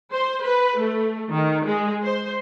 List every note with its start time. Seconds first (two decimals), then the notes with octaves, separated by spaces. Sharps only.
0.12 C5
0.44 B4
0.79 A3
1.31 D#3
1.65 G#3
2.03 C5